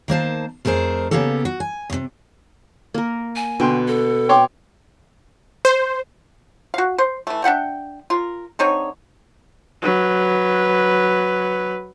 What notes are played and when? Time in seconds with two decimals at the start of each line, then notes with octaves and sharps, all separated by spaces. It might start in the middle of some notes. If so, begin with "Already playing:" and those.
0.08 D#3 A#3 C5 A5
0.65 F2 A3 G#4 A#4 C5
1.11 C#3 G3 A#3 B3 G4 A4
1.45 F#4
1.60 G#5
1.90 D#2 C3
2.94 A#3 A#4
3.36 G#5
3.60 B2 D3 G5 C6
3.88 A4
4.29 C#5 G5 C6 D6
5.65 C5
6.74 F#4 F5
6.98 C5
7.27 E3 A3
7.44 D4 E5 F#5 G5
8.10 F4 A#4
8.59 D3 C4 D#4 C#5
9.83 F#3 B4